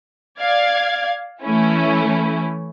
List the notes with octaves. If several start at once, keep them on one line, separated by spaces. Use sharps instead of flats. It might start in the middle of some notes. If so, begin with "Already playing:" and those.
D5 F5 G#6
E3 A3 C#4 E4